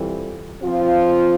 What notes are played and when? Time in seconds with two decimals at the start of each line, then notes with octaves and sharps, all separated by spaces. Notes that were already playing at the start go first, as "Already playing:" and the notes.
Already playing: E3 G3 C4 F4 A4
0.62 F3 C4 F4